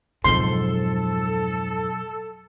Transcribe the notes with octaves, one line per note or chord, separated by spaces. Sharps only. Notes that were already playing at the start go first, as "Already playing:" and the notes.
F2 G#2 B2 F#3 A4 C6